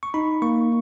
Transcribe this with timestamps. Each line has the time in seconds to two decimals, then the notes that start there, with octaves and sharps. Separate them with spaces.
0.03 C#6
0.14 D#4 B5
0.42 A#3 C#6